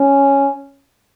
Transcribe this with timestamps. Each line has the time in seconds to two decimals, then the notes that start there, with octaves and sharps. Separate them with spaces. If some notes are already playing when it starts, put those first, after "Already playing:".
Already playing: C#4